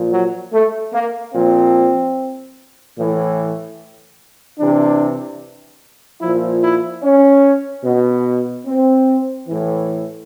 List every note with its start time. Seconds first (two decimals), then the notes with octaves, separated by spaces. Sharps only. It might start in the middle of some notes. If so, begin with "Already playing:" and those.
Already playing: A#2 F3
0.11 F#3
0.52 A3
0.92 A#3
1.33 A#2 F3 C4
2.95 A2 E3
4.58 C3 E3 D4
6.21 A#2 F3 E4
6.62 E4
7.02 C#4
7.83 B2
8.65 C4
9.46 A2 E3